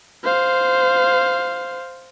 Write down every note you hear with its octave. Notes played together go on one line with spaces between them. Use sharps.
C5 F5